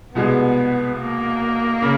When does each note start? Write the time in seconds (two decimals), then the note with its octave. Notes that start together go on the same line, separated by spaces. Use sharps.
0.15 C2 B2 G#3 B3
0.98 A#3
1.82 C#3